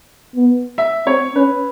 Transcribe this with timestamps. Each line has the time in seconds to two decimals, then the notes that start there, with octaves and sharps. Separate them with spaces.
0.35 B3
0.78 E5
1.07 C4 C#5
1.35 C#4 B4